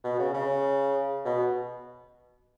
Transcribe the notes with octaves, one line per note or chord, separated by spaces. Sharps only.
B2
C#3
C#3
B2